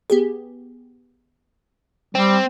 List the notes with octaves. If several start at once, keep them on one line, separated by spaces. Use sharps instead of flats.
B3 G4 G#4
G3 C4